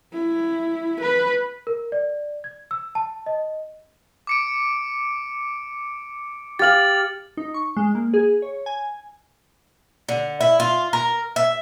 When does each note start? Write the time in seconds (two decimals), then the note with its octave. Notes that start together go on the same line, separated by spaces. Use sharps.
0.13 E4
1.00 B4
1.67 A#4
1.92 D5
2.44 G#6
2.71 E6
2.95 A5
3.26 D#5
4.27 D6 C#7 D7
6.59 G4 F5 A6 F#7
7.37 D#4
7.54 C#6
7.77 G#3
7.95 A#3
8.14 G#4
8.42 C#5
8.66 G#5
10.09 D3
10.41 E4
10.60 F4
10.93 A#4
11.36 E5